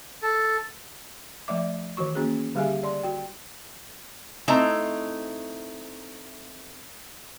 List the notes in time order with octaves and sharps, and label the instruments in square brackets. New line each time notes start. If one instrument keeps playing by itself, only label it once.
[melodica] A4
[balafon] F3 A3 D5 E5 D6
D#3 E3 F#4 C#6
A#3 C#4 F#4 G#4
D3 G3 G4 G#4 E5 G#5
D5 C6
F#4 G5
[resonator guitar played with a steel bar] A3 C4 D#4 E4 A#5